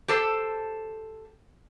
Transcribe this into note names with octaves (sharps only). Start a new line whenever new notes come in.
G4 A4 C5